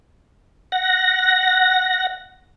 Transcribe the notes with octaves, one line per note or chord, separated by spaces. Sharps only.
F#5 A#6